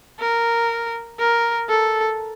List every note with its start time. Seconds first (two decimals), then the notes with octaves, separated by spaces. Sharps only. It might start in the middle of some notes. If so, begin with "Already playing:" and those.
0.20 A#4
1.19 A#4
1.69 A4